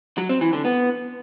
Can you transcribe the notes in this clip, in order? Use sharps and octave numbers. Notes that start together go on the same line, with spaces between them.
F#3
C4
E3
D3
B3